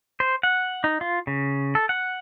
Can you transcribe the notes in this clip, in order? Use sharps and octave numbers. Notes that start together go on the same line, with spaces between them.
C5
F#5
D#4
F4
C#3
A4
F#5